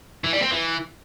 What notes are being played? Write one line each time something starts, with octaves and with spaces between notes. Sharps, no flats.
E3
G3
C4
E3